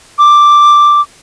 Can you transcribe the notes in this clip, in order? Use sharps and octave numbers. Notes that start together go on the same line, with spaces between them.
D6